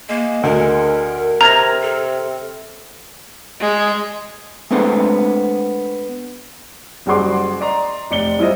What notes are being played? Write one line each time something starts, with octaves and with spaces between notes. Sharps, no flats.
G#3 A#3
D2 A#4
C3 A#5 F6 G#6 A#6
A4
G#3
G#3 A3 B3 C4 D4 A4
F#1 G3 F#4 G#4 C6 D6
D5 D#5 A#5 C6
F1 D5 C#7 G7
G3 E4 F4 C5 D#5